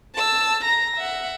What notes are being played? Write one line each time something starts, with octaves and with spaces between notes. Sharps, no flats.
A5 E6
A#5 A#6
E5 F#5